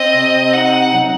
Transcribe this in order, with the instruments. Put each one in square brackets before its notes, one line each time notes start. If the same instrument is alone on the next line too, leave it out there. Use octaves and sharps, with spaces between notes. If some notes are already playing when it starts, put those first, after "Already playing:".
Already playing: [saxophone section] C4 [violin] D#5
[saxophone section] C3
[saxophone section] D#4 [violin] F#5
[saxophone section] F#3